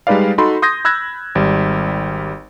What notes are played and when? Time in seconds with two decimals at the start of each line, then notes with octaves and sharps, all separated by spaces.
0.07 G3 G#3 D#4 B4 D5 F5
0.38 D#4 F#4 A4 B5 C6
0.62 C6 D#6 G6 G#6 A#6
0.85 B5 E6 F#6 G#6 A#6
1.35 G#1 G3